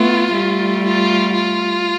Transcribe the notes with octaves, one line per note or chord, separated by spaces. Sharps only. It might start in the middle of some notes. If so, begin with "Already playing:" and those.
Already playing: A3 B3 F4
G3 A3
F4
F4